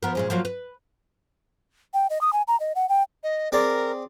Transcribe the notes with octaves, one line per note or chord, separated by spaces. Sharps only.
F3 B3 A#4
A#2 G#3 C#4
F3 F#3 A#3
B4
G5
D#5
D#6
G#5
A#5
D#5
F#5
G5
D#5
C4 G#4 A#4 D5